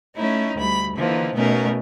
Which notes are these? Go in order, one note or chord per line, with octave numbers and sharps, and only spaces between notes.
A3 C#4 D#4 E4
D2 G3 B5
D3 E3 F3 A#3 D#4
B2 A3 B3 C#4 D#4 A#4